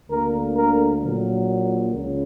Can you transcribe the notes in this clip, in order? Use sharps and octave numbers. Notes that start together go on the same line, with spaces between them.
D2 D3 A#3 A#4
A#4
A#1 A#2 F#3
C#2 C#3